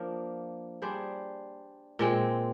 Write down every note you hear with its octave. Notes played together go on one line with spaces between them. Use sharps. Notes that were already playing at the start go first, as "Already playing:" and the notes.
Already playing: F3 A#3 D4
G3 D4 G#4 C5
A#2 G#3 C4